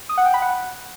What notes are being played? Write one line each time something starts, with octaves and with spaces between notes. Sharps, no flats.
D#6
F#5
G5
B5
F#5